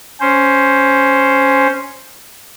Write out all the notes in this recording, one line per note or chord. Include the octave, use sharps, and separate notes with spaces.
C#4 C5